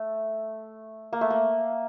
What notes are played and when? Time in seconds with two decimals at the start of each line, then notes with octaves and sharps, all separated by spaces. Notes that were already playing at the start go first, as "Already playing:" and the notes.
Already playing: A3
1.13 A#3
1.21 A3
1.30 A#3